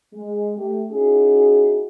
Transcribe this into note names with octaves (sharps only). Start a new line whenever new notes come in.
G#3
A3 G4
C#4 D#4 E4 F#4 G#4